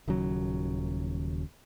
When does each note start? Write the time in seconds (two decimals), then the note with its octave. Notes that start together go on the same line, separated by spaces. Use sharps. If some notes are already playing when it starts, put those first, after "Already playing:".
0.08 D#1 D#2 C#3 F#3